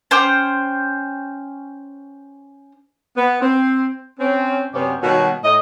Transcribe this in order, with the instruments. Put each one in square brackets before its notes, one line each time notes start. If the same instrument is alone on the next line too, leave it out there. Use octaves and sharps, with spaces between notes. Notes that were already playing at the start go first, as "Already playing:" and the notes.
[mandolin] C#4 C5 G5 D6
[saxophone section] B3
C4
C4 C#4
F#2 C3 B3 C#4 C5 D5
B2 D#3 F#3 G3 F#4 C#5
A2 D#5